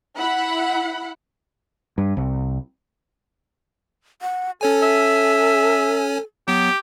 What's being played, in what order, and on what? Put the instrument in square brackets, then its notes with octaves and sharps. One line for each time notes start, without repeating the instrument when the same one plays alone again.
[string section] E4 F#5 B5
[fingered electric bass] G2
C2
[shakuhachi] F#5
[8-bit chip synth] C#4 C#5 G#5 [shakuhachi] A4
[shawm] E5
[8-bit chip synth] F#3 B3 [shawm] G4